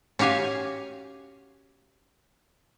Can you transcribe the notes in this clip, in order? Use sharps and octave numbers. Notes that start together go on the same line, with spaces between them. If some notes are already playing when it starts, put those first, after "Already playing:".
C#4 F#4 G4 F5 G#5